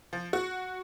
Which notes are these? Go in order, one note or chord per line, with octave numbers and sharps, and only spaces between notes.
F3
F#4